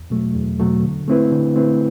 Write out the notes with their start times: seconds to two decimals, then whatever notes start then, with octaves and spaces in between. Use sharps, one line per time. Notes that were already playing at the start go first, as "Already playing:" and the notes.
Already playing: E2
0.10 B2 F#3 A3
0.35 E2
0.60 B2 F#3 A3
0.83 D3
1.08 A3 C4 E4 B4
1.32 D3
1.56 A3 C4 E4 B4